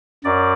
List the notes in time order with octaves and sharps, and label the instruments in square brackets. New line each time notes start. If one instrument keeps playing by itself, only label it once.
[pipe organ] F#2 D5